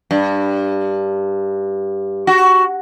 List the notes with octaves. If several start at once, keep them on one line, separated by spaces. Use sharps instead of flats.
G2
F#4